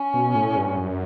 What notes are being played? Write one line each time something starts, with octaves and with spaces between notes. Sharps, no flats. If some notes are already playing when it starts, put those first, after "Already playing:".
Already playing: C#4
B2
A2
G2
F#2